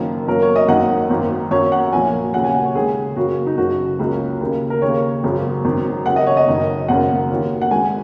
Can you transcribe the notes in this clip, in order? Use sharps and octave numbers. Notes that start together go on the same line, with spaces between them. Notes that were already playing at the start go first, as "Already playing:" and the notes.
Already playing: F#1 F#2 D#3 A#3
F#2 F#3 A#3 A#4
C#5
D#5
G#1 F#2 D#3 A#3 F#5
G#1 F#2 D#3 A#3
F#2 F#3 A#3 C#5
F#5
A#1 A#2 F#3 A#3 G#5
D#2 C#3 F#3 A#3 F#5
G#5
F#5
C#5
D#2 C#3 G#3 G#4
F#2 C#3 F#3 A#3 F#4
D#4
F#1 F#2 C#3 F#4
C#2 C#3 F#3 A#3
D#2 C#3 A#3
A#4
D#2 C#3 A#3 C#5
G#1 F#2 C#3 F#3 A#3
G#1 F#2 D#3
D#2 C#3 F#3 A#3 F#5
D#5
C#5
D#5
F#1 F#2 D#3
G#1 F#2 C#3 A#3 F#5
D#2 D#3 F#3 A#3
F#5
G#1 G#2 G#3 G#5